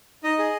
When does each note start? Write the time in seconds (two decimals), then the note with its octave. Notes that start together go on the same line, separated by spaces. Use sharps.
0.24 D#4 D#5
0.39 G#4